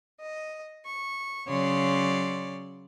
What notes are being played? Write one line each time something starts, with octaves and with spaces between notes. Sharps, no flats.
D#5
C#6
C#3 F#3 C#5 D5 C6